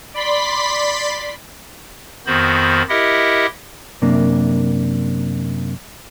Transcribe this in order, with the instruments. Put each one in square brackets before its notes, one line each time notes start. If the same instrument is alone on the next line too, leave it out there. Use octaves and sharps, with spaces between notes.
[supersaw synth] D5 B5 C6 B6
[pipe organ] F2 D#3 B3 F#4 C5 B5
E4 G4 A#4 D#5 E5 F#5
[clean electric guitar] F#2 C3 A#3 D4